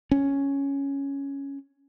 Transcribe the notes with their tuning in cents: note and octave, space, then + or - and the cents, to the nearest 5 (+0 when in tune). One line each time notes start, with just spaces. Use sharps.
C#4 +0